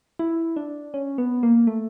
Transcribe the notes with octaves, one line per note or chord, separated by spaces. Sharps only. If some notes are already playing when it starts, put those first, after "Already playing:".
E4
D4
C#4
B3
A#3
A3